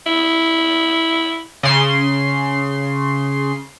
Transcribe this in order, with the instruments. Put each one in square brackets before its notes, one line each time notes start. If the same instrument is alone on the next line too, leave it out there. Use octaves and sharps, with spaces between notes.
[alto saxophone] E4
[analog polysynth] C#3 C6